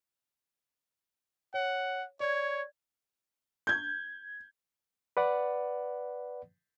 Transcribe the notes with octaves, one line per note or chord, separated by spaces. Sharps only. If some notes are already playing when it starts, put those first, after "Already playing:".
C#5 F#5
C#5 D5 G#6
G6 G#6
B4 D5 F#5